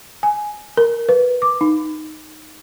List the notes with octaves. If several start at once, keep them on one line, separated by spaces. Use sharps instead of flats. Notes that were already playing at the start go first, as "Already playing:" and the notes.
G#5
A#4
B4
D6
D#4